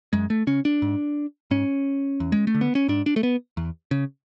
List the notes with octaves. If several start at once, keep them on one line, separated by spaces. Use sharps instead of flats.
F#2 G#3
A3
C#3 C#4
D4
G#2
G#2 C#4
E2
G#3
A3
D3
B3
C#4
G#2 D4
D4
A3
B3
E2
C#3